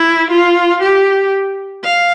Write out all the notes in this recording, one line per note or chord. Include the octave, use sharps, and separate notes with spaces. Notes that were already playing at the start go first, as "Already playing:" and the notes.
Already playing: E4
F4
G4
F5